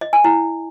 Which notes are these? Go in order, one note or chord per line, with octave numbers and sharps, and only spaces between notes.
D#5
G#5
E4